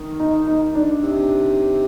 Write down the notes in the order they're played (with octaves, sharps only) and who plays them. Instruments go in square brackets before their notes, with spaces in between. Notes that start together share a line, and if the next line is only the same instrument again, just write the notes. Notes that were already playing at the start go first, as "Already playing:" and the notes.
Already playing: [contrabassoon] D#3
[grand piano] D#4
D#4
D4
[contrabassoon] C3